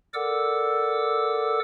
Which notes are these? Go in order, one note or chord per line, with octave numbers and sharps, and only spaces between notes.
A4 A#4 D5 F#5 D6 E6